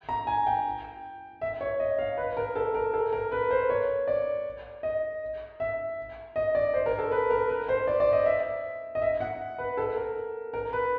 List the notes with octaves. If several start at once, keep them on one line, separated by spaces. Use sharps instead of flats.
A#5
G#5
G5
E5
C#5
D#5
F5
B4
A#4
A4
A#4
A4
A#4
B4
C5
C#5
D5
D#5
E5
D#5
D5
C5
A#4
A4
B4
A#4
B4
C5
D5
D5
D#5
E5
D#5
E5
F#5
B4
A4
A#4
A#4
B4